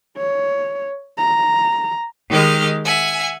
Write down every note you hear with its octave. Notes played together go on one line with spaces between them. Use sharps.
C#5
A#5
D#3 G#3 G4 F6
E5 F#5 G#5